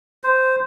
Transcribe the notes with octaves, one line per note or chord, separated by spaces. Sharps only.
C5